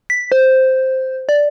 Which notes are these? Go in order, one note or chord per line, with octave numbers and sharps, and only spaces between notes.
B6
C5
D5